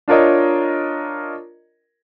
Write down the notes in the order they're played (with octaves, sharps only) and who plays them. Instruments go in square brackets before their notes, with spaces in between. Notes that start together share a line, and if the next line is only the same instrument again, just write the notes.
[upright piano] D4 F4 A#4 C#5 D#5